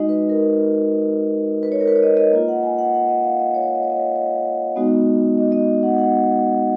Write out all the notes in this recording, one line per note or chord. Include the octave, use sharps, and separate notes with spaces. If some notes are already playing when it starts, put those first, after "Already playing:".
Already playing: G#3 D#4 F#4 D#5
B4
A#4
B4
C#5
A#4
B4
C#5
D#5
D#5
A#3 F4 D#5
F#5
G#5
F#5
F#5
D#5
F5
D#5
C#5
D#5
C#5
D#5
C#5
D#5
C#5
D#5
G#3 B3 D#4 F#4
D#5
D#5
F#5
F#5